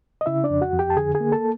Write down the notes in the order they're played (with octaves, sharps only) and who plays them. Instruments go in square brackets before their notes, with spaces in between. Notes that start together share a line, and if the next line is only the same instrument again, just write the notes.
[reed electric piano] D#5
C#3 E4 E5
D4 D5
F2
F#4 F#5
F2
G4 G5
A5
D3 G#4 G#5
G#4 G#5
A#3
A4 A5